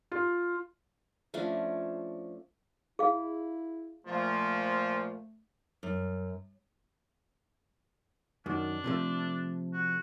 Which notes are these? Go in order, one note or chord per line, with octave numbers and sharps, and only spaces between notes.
F4
F3 A3 C#4 D4
E4 G#4 F5
A#2 F3 A3
F#2
F#2 D#3 D4
C3 F3 A3
F#4